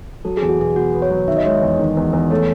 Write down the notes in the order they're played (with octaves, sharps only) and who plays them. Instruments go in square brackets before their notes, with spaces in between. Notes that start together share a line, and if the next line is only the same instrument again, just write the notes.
[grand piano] F#3 [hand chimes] A4
[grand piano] E2 [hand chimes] G#4
[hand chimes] F#4
[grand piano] B2 [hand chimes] G#4
[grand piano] B3 [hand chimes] F#4
[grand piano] B3
[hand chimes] C#5
[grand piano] F#3
[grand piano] D#3 [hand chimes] E5
[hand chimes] D#5
[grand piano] G#3 [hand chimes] C#5
[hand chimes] D#5
[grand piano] E2
D#3
E2
E2
[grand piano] A3 [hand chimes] C#5